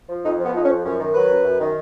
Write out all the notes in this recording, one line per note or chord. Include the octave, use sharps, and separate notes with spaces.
F3
F2 D#4
F3
B3
F2 D#4
C#4
F3
F#2 C#4
D#3
F#3 B4
F#2
F#2
D#3